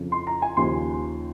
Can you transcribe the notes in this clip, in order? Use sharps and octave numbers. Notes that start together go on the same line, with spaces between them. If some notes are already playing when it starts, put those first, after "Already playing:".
Already playing: F2 C#3 F3
C6
A#5
G#5
D#2 C#3 F3 C6